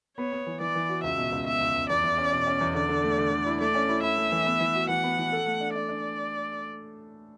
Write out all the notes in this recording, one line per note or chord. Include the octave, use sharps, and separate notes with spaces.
B3 C#5
B3
E3
E3 D5
E3
F#4
C#2 E5
B2
C#2
B2 E5
C#2
C#2
E2 D5
E2
C#4
B2
C#4
E2
D3 D5
D3
A3
D3
D3
E4
A3 D5
C#4
E4
E4 E5
A3
E3
B3
E3
F#4
E3 F#5
B3
E3
A4
A3
D4
D4 D5
D4